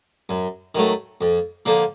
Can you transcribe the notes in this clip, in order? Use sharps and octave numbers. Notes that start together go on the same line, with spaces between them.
F#2
D#3 F#3 A3
F2
D3 F3 A#3